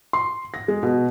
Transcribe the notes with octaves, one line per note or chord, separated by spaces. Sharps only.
C6
A#6
G#3
B2